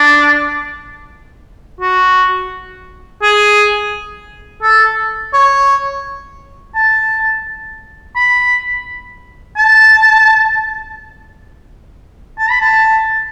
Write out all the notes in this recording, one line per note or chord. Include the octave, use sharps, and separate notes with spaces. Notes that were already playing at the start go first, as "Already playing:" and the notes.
Already playing: D4
F#4
G#4
A4
C#5
A5
B5
A5
A5
B5
A5